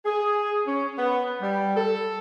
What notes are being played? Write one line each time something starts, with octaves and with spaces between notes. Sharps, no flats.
G#4
C#4
B3
G3
A4